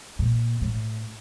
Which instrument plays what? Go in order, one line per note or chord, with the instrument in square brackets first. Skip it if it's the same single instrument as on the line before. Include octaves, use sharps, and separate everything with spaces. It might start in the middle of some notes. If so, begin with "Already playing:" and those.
[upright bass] A#2
A2